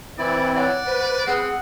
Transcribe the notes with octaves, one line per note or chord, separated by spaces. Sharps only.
E3 C4 E4 D5
C#5 D5 F#5
B4 C5
C4 G#4 F#5